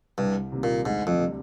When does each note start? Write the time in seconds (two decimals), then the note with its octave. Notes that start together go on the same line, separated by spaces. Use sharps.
0.18 C2 G2
0.52 C3 D#3 G3 A#3
0.63 A#2
0.85 D2 G#2
1.07 F2
1.19 C3 G3 D4